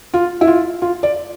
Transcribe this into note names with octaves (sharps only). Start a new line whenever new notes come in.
F4
E4
F4
F4
D5